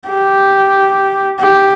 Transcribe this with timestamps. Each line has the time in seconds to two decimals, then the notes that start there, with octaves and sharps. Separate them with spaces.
0.09 G4
1.40 G4